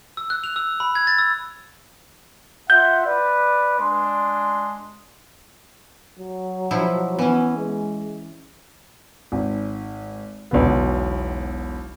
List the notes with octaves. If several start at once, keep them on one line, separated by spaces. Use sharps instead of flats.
E6
F#6
F7
E6
B5
G#6
A6
E6
F4 E5 F#5 G6
B4 D5
G#3 D4 C6
F#3
B2 F3 E4
E3 B3 C#4
G#3
G#1
E1 B1 D3 B3